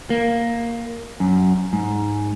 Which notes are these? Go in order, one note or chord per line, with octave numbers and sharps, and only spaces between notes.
A#3
F#2
G#2